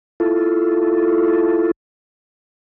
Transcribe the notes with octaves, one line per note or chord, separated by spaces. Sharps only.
E4 F4 A4